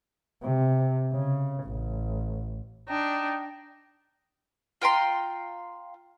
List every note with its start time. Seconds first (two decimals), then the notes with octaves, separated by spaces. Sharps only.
0.43 C3
1.12 C#3
1.64 A1
2.88 D4 D#4 G5
4.82 F4 G5 A#5 C6